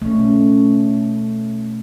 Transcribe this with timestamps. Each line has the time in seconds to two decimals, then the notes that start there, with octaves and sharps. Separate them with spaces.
0.02 B2 A3 C#4